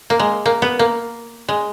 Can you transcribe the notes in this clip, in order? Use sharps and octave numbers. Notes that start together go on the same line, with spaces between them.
A#3
G#3
A#3
B3
A#3
G#3